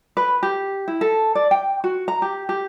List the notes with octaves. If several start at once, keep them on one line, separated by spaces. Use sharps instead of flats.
B4
G4
E4
A4
D5
G5
F#4
A#5
G4
G4